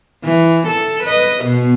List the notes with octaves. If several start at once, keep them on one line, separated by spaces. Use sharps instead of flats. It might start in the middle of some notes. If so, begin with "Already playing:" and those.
E3
A4
B4 D#5
B2 B3